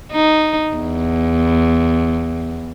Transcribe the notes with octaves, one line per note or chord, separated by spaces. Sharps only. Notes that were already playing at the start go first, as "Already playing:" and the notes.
D#4
E2